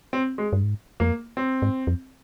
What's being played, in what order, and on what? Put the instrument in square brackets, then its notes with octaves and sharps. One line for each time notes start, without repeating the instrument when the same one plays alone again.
[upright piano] C4
G#3
[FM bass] G2
G#2
[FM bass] F2 [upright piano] A#3
[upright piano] C4
[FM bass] G#2
F2